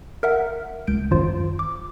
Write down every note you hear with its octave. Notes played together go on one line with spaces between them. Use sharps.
A#4 E5 F#5
C#2 G6 D7
G#1 F#2 F4 C5
D6